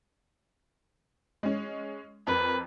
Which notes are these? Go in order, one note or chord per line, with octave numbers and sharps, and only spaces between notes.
G#3 C#4
F2 A#4 B4